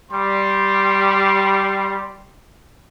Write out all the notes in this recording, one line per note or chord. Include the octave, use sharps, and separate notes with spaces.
G3 C6